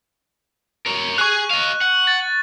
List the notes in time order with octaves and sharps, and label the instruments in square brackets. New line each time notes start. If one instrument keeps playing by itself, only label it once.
[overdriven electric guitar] A#4 C#5
[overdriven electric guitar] G#4 G#5 [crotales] C#6 F#6
[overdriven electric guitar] D#5 F5
F#5
[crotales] A6